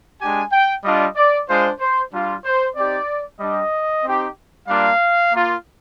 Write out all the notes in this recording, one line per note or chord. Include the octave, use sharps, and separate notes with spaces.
G#3 D4 G4 G#5
G5
G3 D4 F4 D#5
D5
G#3 D4 F4 C5
C5
G3 D4 F4
C5
C4 D#4 G4 D5
G3 D4 G4 D#5
C4 D#4 G4
G3 A#3 D4 F4 F5
A#3 F4